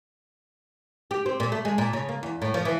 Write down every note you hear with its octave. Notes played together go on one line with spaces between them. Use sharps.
G4
C4
A#2
A3
G#3
A#2
C#3
A#3
E2
A2
F3
E3